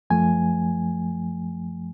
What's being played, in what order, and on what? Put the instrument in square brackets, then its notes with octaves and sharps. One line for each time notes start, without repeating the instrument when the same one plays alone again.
[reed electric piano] F#2 F3 A3 G#5